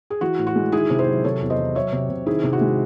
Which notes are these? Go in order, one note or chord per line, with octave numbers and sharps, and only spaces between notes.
G#4
E3 F#4
A2
F#4
G#3
D#3 E4 G#4
C3
G#4 C5
F#3
C3 A4 C#5
E2
C5 D#5
E3
F#3 C#5 E5
C3
C3
D#3 E4 G#4
C3
F#4
G#3